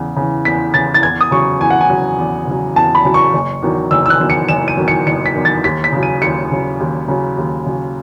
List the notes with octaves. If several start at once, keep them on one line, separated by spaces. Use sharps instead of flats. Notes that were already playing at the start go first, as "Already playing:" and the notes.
Already playing: E2 C#3 E3
C#3 E3
E2 B6
C#3 E3 A6
A6
E2 G#6
D#6
C#3 F#3 C#6
E2 G#5
F#5
G#5
C#3 F#3
E2
C#3 F#3
E2 A5
B5
C#3 F#3
C#6
F#1
E2 D#3 F#3
F#1 E6
E6
F#6
E2 D#3 F#3
C#7
F#1 E7
D#7
E2 D#3 F#3
C#7
F#1 C#7
B6
E2 D#3 F#3
A6
D#2 B6
B6
C#3 F#3
D#7
D#2 C#7
C#3 F#3
D#2
C#3 F#3
D#2
C#3 F#3